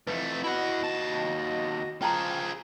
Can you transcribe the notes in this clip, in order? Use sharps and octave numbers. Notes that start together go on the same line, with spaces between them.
F2 E3 A3 B4
E4 F#4 D#5 F#5
D#2 A5
F3 F4 G#4 G5 A5 A#5